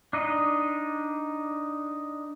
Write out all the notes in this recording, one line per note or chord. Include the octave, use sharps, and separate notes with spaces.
D4 D#4 D#5